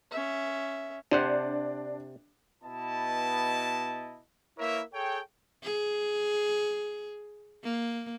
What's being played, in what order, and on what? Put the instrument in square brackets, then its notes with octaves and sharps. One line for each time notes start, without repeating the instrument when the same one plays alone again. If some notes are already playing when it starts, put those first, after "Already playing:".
[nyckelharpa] C#4 E5
[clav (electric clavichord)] C3 C5 F#5 [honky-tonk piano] D4
[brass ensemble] B2 B3 E4 D#5 A5
A#3 E4 A#4 B4 C#5 E5
G#4 A4 C#5 G5
[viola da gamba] G#4
A#3